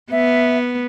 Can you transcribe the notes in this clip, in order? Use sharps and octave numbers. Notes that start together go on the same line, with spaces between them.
B3 E5